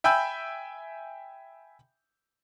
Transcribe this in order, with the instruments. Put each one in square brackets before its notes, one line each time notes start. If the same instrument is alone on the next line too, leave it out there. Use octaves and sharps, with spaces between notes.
[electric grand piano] E5 G5 G#5 B5 E6 G6